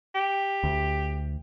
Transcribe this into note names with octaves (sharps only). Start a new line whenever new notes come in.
G4
D2